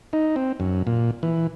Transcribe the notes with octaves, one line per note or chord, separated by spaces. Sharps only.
D#4
C4
F#2
A#2
E3